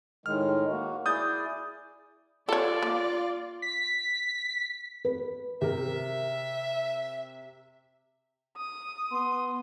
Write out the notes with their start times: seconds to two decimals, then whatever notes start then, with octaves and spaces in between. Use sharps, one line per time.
0.26 A2 D#3 G#3 F6
0.70 A#3 F#4
1.06 E4 G#4 D5 D#6 G6 A6
2.49 F4 A4 C#5 D5
2.82 A#3
3.62 B6
5.05 B4
5.61 C3 A#4 E5
8.57 D#6
9.11 B3 C6